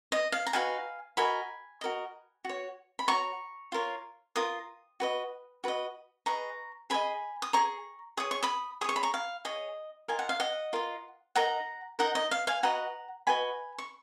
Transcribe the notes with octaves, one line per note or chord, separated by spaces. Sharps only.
D#5
F5
A#5
D#4 F#4 B4 F5 G#5
F#4 A#4 D#5 G#5 B5
F#4 A#4 D#5
F#4 C#5
B5
F#4 C#5 A#5 C#6
F4 A#4 C#5
F4 A#4 D#6
F#4 B4 D#5
F#4 B4 D#5
G#4 B4 D#5 A#5 C#6
G#4 B4 D#5 G#5 B5
D#6
G#4 C#5 A#5 C#6
G#4 C#5 D#6
C#6
B5 D#6
G#4 C#5 C#6 D#6
B5
A#5 C#6
F5
G#4 C#5 D#5
F4 A#4 D#5 G#5
F#5
F5
D#5 F#5
F4 A#4 D#5
D#4 A#4 D#5 F#5 A#5
D#4 A#4 D#5 F#5 A#5
D#5
F5
F5 G#5
F#4 B4 D#5 F#5 A#5
F#4 B4 D#5 G#5 B5
C#6